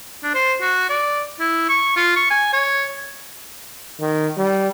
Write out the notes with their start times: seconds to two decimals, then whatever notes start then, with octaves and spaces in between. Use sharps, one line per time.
0.23 D4
0.34 C5
0.61 F#4
0.89 D5
1.40 E4
1.69 C#6
1.96 F4
2.16 C#6
2.30 G#5
2.53 C#5
4.01 D#3
4.37 G3